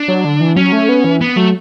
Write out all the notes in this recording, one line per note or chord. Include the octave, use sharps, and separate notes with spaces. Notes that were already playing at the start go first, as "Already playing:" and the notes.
Already playing: D4
F#3
D3
E3
F#3 C#4
A3
B3
E3
B3
F#3 A3